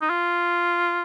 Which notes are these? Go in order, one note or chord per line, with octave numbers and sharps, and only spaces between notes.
D#4
F4